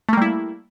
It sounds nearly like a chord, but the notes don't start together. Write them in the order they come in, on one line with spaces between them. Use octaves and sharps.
A3 A#3 G3 E4